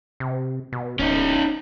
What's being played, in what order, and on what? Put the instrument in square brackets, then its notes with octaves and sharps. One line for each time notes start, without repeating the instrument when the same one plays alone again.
[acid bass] C3
B2
[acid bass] D1 [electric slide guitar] C#4 D#4